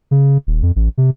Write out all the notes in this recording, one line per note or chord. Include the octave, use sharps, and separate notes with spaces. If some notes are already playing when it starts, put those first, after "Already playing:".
C#3
D#1
F2
A1
C3